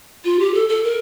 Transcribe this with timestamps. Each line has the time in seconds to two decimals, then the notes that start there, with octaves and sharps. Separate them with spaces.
0.25 F4
0.39 G4
0.54 A4
0.69 A4
0.84 A#4